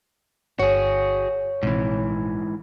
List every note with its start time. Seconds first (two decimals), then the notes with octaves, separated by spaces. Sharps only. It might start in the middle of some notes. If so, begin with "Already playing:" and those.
0.59 G1 F#4 G#4 C#5
1.63 A#1 G#2 C3 E3